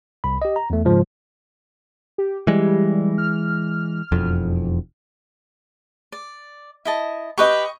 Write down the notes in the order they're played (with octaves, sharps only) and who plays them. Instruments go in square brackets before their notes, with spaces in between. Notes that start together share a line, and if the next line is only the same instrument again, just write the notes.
[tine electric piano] C2 B5
G4 D#5
A#5
E2 A3
G#2 C#3 F3 G#3
[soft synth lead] G4
[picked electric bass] E3 G#3 [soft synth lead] G3
[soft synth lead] F6
[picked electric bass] E1 F2
[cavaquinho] D5
E4 D#5 A5
[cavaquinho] G4 B4 G5 [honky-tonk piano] D#5 C#6